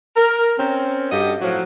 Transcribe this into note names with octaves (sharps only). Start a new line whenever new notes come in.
A#4
C4 C#4
G2 F#4 G4 A4 D#5
A2 F3 F#3